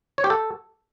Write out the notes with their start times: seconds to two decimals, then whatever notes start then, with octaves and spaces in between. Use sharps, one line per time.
0.18 C#5
0.24 G4
0.30 A4